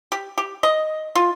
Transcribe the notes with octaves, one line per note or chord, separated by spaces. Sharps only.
G4
G4
D#5
F4